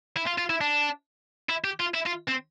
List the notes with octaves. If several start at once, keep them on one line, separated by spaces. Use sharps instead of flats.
E4
F4
F4
E4
D4
E4
G4
F4
E4
F4
C4